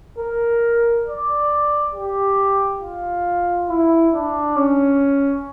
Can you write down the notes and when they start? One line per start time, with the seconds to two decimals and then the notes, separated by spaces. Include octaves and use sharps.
0.18 A#4
1.06 D5
1.94 G4
2.82 F4
3.69 E4
4.13 D4
4.56 C#4